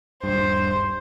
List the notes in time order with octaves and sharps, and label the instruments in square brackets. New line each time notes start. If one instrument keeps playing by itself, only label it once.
[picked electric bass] D#1 G2 [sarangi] C5